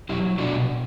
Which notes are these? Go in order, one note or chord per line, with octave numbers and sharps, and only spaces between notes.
F#3 E4 G4
B2 D4 F#4